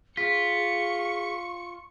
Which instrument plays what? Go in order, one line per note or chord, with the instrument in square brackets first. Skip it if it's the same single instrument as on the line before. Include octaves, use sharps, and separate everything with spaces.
[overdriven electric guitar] F4 [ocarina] G#4 [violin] C#6 C#7 [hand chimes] B6